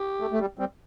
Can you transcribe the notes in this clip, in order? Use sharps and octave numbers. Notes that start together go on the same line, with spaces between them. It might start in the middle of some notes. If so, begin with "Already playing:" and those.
Already playing: G4
A3
A3
G3
G3 C4